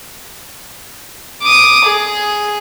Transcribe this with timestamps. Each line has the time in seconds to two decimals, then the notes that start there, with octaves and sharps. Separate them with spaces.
1.42 D6 D#6
1.85 G#4